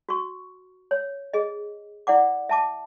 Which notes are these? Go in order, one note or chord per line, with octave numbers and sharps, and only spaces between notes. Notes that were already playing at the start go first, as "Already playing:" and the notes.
F#4 C#6
C#5
G#4 D#5
E4 D5 F#5 D6
E5 A5 D6